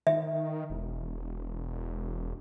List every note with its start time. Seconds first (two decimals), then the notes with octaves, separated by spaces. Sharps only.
0.07 D#3 E5
0.70 E1